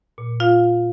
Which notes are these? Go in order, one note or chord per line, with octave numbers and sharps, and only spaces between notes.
A#2
F4 F5